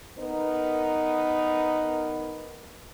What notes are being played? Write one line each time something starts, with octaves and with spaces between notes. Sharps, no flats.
B3 D#4 A#4 B4